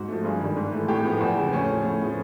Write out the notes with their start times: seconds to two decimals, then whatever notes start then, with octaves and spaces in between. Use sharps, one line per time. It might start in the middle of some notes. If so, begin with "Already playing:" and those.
Already playing: G#2 F#4
0.08 F3 A3
0.25 G2 G#4
0.40 D#3 G3
0.57 G#2
0.72 E3 A3
0.88 A2 G4
1.04 F3 G#3 B3
1.21 E2
1.37 C#3 F3
1.53 A2 C#4
1.69 F3 A3
1.84 A2
2.01 F3 G#3 B3